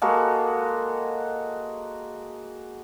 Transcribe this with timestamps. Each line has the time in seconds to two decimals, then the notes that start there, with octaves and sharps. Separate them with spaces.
0.02 G#3 A#3 F#4 A4